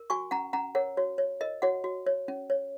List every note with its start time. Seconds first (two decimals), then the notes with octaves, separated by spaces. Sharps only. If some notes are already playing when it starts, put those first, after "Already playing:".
Already playing: A#4
0.10 F#4 G#5 C#6
0.31 C#4 F#5 A#5
0.53 C#4 F#5 A#5
0.75 A#4 C#5 F#5
0.97 F#4 C#5
1.18 C#5
1.41 A#4 D#5
1.62 F#4 C#5 F#5
1.84 F#4
2.06 C#5
2.28 C#4
2.50 C#5